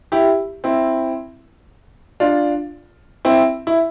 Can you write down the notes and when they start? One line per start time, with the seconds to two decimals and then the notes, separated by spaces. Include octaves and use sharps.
0.12 E4 G4
0.64 C4 E4
2.20 D4 F4
3.25 C4 E4
3.67 E4